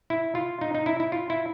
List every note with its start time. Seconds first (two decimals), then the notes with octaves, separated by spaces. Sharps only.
0.10 E4
0.35 F4
0.61 D#4
0.74 D#4
0.86 E4
1.00 E4
1.12 F4
1.30 E4